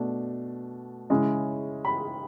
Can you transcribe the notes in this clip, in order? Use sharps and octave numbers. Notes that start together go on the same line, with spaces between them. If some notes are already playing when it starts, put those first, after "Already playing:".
Already playing: B2 A3 D4
C#3 G#3 C#4 E4
B5